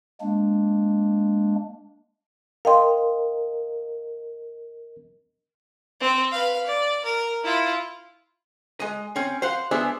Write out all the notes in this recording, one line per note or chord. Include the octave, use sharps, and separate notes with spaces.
G#3 A#3 D4
A#4 D#5 F5 G5 C6
C4
B4 F5
D5
A#4
E4 F4
G#3 D#5
C4 C#4
C5 F5 F#5
G#3 B3 D4 G#4 C5 E5